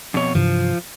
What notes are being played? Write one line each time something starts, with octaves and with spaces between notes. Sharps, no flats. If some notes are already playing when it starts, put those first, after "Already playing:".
F2 B2 C#5
G2 C3 E3 F3